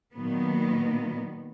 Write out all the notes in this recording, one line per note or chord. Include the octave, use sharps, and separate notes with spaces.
A#2 D#3 F#3 B3